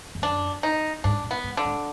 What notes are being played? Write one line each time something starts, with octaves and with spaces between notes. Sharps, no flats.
F2
F#2 D4
D#4
G#2 D4
A#2
B3
G#2
D3
G#2